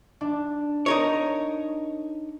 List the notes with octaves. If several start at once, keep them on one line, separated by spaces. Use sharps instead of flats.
D4
D#4 A#4 C#5